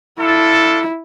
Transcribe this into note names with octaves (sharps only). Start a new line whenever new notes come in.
D4 E4 F4 A4